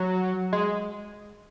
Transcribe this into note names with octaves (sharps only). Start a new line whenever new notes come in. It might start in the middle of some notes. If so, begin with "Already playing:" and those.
Already playing: F#3
G#3